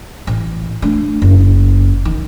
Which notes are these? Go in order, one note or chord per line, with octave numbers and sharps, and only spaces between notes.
A1
A3 D4
F#1
D#3